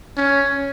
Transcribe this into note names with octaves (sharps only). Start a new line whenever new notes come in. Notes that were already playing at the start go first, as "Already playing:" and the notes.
C#4